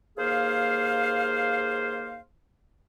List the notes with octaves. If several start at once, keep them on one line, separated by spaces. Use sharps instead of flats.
D#2 A#3 G#4 C5 F5